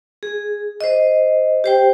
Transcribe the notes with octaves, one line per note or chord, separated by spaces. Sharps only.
G#4
C5 D#5
G4 C5 G5